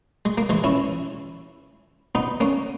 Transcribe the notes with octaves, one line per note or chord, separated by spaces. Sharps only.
G#3
A#3
E3 G#3
C#4 E4
B3 D#4
A#3 C#4